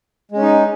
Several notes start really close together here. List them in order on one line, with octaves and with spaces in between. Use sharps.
G#3 C#4 D#4